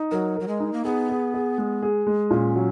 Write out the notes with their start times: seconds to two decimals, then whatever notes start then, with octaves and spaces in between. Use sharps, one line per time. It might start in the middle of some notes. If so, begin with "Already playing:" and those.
Already playing: D#4
0.11 F#3 A#4
0.36 F#3 A#4
0.48 G#3
0.60 D#4
0.73 A#3
0.85 B3 G#4
1.10 G#4
1.34 G#4
1.58 G#3
1.82 G#4
2.07 G#3
2.31 A#2 C#4
2.56 F#3